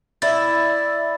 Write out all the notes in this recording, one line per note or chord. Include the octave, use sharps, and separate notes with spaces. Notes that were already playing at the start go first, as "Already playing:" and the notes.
E4 D5 B5 A6